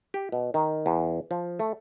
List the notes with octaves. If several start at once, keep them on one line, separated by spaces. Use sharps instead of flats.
G4
B2
D#3
E2
F3
A3